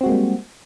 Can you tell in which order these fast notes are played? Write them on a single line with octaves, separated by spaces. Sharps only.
C4 F#4 G#3 A#3 G3